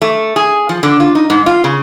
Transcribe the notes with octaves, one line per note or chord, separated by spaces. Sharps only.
A3
G#4
F3
D3
F4
D#4
G#2
F4
C#3